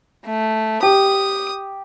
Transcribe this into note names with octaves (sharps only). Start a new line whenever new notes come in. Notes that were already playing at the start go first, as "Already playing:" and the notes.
A3
G4 D#6